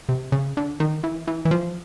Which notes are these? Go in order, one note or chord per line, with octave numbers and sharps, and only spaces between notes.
C3
C#3
D3
D#3
E3
E3
E3
F3